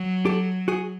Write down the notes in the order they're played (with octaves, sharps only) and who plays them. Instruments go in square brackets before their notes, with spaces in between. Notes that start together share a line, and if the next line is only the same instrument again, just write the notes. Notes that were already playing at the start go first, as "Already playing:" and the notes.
Already playing: [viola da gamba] F#3
[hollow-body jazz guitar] G4 A4
F#4 G#4